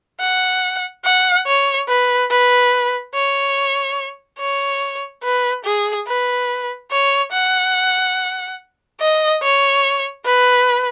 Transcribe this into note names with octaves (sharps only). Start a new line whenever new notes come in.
F#5
F#5
C#5
B4
B4
C#5
C#5
B4
G#4
B4
C#5
F#5
D#5
C#5
B4